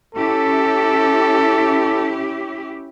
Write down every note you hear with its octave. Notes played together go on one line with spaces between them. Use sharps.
C#4 E4 G4 A4